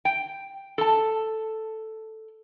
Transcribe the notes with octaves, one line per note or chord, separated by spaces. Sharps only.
G5
A4 A5